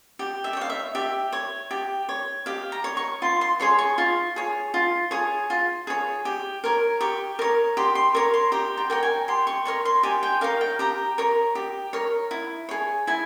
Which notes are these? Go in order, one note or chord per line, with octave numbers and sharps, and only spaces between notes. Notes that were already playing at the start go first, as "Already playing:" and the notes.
G4
E5
G5
C#5 F5
E5
G4 E5
C#5
G4
C#5
G4 F5
A#5
C#5
C#6
F4 C6
C6
G#4 C#5 C6
C#6
F4 C#6
G#4 C#5
F4
G#4 C#5
F4
G#4 C#5
G4
A#4 C#5
G4 C#6
A#4 C#5
G4 C6
C6
A#4 C#5 C#6
C6
G4 A#5
G5
A#4 C#5 G5
G#5
G4 C6
C#6
A#4 C#5 C#6
C6
G4 G#5
G5
A#4 C#5 F5
G5
G4 A#5
A#4 C#5
G4
A#4 C#5
E4
G#4 C#5
E4 G#5